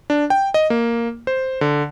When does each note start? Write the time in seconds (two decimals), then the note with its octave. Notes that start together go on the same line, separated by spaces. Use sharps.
0.10 D4
0.30 G5
0.54 D#5
0.70 A#3
1.27 C5
1.61 D3